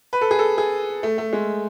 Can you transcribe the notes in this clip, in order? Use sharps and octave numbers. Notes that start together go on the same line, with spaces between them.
B4
A4
G#4
A4
G#4
A3
A3
G#3